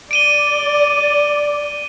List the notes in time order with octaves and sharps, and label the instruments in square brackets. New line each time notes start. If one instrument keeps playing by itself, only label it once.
[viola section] D5 [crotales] D7 D#7 G7